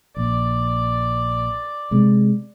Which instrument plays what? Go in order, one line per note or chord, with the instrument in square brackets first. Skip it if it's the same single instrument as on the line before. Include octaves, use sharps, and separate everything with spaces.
[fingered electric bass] A#1 [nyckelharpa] D5
[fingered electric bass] C3 G#3